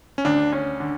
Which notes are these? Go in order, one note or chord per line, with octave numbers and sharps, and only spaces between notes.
C#4
D2 D4
C#4
D3